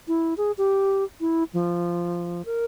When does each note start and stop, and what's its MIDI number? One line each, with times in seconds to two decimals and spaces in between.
0.08 0.34 64
0.37 0.52 68
0.58 1.04 67
1.20 1.44 64
1.54 2.45 53
2.45 2.65 70